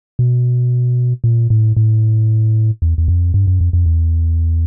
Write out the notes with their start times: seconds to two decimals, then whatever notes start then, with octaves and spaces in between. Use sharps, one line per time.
0.19 B2
1.24 A#2
1.50 A2
1.77 A2
2.82 E2
2.98 E2
3.08 F2
3.34 G2
3.47 F#2
3.61 F2
3.73 F2
3.86 E2